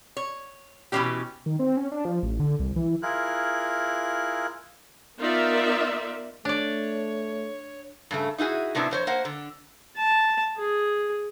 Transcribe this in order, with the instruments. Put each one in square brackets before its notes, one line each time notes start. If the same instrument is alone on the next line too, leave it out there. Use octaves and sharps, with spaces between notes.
[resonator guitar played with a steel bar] C#5
B2 E3 F#3 A#3 C#4 G4
[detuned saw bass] D#3
C4
C#4
D4
F3
A1
D3
C2
E3
[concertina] E4 F4 G#4 A#4 F#6
[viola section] B3 D#4 F4 A#4 D5 E5
[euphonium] A3 [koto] D4 D5 [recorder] C#5
[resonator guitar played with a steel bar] G2 C#3 A3
D#4 E4 F#4 G#4
A2 C3 F#3 B3 D4 E4
F2 C5 C#5
A#3 C5 F#5
D3
[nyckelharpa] A5
G#4